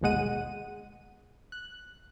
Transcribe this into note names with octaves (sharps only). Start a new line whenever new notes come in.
G#1 D#2 B2 G#3 F#5 D#7
F#6